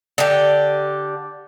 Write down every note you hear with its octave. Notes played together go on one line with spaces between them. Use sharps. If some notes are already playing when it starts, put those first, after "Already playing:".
D3 G4